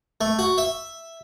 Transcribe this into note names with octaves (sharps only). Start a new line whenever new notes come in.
A3
F#4
E5